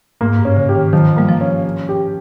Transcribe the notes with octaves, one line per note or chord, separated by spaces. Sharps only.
G#2 A#3
G2
C#4
C#3
G4
D#3
D#3 F3
G3 A#3
F3
C#4
C#4
G4